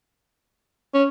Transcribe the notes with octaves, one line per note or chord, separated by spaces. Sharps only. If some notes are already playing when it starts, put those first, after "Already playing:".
C#4